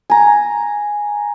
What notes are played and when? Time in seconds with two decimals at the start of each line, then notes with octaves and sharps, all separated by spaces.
0.10 G#5 A#5